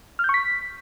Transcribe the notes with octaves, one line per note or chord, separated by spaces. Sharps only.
F6
G6
C#6
B6